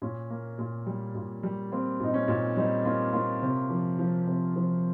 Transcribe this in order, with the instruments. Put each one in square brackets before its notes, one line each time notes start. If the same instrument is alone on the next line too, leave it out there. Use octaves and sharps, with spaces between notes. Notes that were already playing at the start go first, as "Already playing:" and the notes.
[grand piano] A#2 C#4
A#3
A#2
G3
A#2
G3
A#3 C4
A#2 D#4
C#4
A#2
G3 C4 D#4
A#3 C#4 F4
A#3 C#4 F4
C3
F3
F3
C3
F3